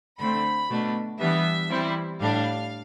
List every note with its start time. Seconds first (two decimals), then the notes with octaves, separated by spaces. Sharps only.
0.18 D3 A3 C4 B5
0.69 B2 A3 D4
1.19 E3 G3 B3 D4 E5
1.69 E3 G3 C4 E4
2.20 A2 G3 D4 F5